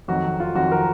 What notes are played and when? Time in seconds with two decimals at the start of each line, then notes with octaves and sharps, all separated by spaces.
0.08 F2 D#3 F#3 F#4
0.40 F4
0.55 F2 D#3 F#3 F#4
0.71 A#4